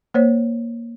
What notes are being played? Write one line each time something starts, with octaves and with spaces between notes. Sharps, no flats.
A#3 C5 C#5